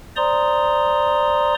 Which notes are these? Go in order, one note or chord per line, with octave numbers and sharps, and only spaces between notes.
C5 D5 A#5 C6 D#6